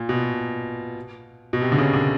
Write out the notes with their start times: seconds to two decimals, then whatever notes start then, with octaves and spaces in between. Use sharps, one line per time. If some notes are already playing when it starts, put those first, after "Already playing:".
Already playing: A#2
0.09 B2
1.53 B2
1.61 C3
1.72 D3
1.78 C#3
1.93 D3